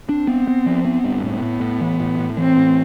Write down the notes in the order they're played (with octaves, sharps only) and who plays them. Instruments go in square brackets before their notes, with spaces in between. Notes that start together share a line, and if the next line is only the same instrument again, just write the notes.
[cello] C4 [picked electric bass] D4
[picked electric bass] B3
B3
F3
B3
G2
[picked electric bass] A2 [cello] B3
[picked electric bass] A2
A2
E3
A2
A2
[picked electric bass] E3 [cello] C4
[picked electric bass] A2